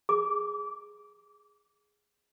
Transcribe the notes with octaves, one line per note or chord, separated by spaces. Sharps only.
G#4 D6